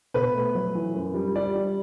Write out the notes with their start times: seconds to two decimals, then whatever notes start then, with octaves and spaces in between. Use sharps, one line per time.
0.14 B2 B4
0.35 A3
0.55 F#3
0.75 E3
0.95 F#2
1.14 G3
1.36 G3 D5
1.56 G3